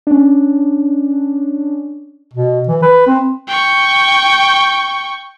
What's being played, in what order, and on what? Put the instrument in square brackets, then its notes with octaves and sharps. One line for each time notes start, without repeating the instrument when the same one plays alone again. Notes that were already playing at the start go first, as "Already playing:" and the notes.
[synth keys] C#4 D4
[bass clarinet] B2
E3
B4
C4
[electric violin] G5 C#6